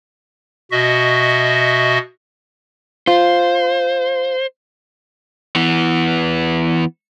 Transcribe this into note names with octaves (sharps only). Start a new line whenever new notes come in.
B2 F#4 D#5 E5
F4 C5
E3 B3